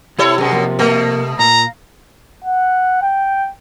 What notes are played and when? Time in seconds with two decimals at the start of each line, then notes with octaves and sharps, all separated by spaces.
0.18 C3 E4 G4 A4 C#5
0.38 F#2 B2 G#4
0.51 F3 A#3
0.79 B2 F3 A3 A#3
1.39 A#2 F5 A#5
2.44 F#5
3.02 G5